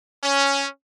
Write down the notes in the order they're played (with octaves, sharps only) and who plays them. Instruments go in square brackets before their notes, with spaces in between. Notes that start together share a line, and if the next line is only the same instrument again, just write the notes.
[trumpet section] C#4